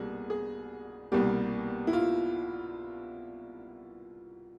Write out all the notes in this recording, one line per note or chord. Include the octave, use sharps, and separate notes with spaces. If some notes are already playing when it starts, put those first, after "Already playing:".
Already playing: C2 B2 G3 A#3 G#4
G#4
C2 B2 G3 A#3 G4
E4
F4